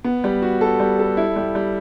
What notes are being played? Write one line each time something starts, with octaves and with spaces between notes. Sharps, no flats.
B3
G3
F#4
A4
G3
A4
E4
G3
G3